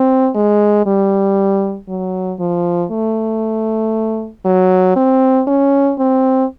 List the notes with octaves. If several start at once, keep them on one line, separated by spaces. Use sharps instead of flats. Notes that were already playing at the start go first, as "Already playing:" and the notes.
Already playing: C4
G#3
G3
F#3
F3
A3
F#3
C4
C#4
C4